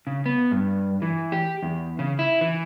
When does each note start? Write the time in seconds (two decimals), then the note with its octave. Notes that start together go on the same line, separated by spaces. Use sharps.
0.07 C#3
0.26 B3
0.52 G2
1.02 E3
1.32 G4
1.63 E2
1.99 C#3
2.19 E4
2.41 E3